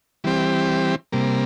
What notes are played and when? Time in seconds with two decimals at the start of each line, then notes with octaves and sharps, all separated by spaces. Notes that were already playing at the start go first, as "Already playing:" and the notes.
0.24 E3 G3 C4 G4
1.12 C3 G3 A#3